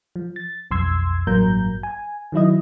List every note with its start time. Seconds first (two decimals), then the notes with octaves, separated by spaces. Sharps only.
0.16 F3
0.36 A6
0.71 B1 F2 C6 E6 G#6
1.27 A1 G2 F#3 A#3 A#5 G6
1.83 G#5
2.32 D#3 F#3 E4 D#5